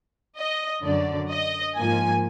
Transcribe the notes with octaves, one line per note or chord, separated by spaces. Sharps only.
D#5
F#2 D3 F#3 D5
D#5
G#2 F3 A#3 G#5